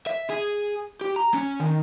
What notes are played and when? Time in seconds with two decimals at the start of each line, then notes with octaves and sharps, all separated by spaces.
0.07 E5
0.30 G#4
1.01 G4
1.16 A#5
1.34 C#4
1.60 D#3